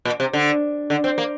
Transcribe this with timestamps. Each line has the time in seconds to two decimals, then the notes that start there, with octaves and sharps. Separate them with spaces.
0.05 A#2
0.20 C3
0.33 D3
0.90 D3
1.04 C4
1.18 A#3